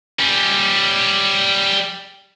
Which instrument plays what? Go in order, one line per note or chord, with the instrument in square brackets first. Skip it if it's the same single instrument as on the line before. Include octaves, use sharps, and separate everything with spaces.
[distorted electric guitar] G3 C#4